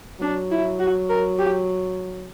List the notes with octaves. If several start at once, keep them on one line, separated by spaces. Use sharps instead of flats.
F#3 D4
E4
F#4
A#4
G4